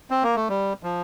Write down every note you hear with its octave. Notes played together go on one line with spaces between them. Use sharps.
C4
A#3
A3
G3
F3